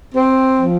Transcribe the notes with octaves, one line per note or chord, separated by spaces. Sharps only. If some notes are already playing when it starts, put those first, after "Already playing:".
C4
F3